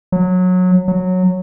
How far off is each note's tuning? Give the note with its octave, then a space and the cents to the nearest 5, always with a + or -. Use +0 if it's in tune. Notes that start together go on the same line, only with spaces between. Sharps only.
F#3 -20
F#3 -10